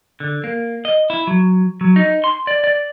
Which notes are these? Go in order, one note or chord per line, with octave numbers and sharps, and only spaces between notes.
D3
A#3
D#5
E4
F#3
F#3
D#4
C6
D5
D5